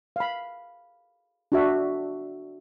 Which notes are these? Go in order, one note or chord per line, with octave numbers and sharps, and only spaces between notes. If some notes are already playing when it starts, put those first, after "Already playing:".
F5 B5
D4 F#4 E5